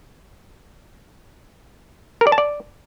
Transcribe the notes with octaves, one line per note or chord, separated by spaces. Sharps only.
A#4
D5
A5
D5